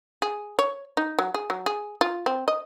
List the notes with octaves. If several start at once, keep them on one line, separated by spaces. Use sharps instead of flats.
G#4
C#5
D#4
F#3
G#4
F#3
G#4
F4
C4
D#5